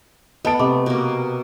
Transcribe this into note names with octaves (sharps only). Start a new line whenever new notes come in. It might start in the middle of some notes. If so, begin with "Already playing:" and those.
B3 A4 D#5 A5 D7
C3 A3 D#5 D6
B2 A#3